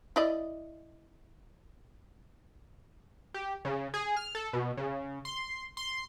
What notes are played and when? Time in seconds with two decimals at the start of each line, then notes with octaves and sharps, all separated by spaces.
0.16 E4 D5 D#5
3.34 G4
3.65 C#3
3.94 G#4
4.16 F6
4.35 A4
4.53 B2
4.77 C#3
5.25 C6
5.77 C6